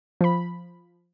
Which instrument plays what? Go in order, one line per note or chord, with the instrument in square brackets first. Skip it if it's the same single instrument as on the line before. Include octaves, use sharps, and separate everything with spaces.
[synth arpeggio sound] F3 B5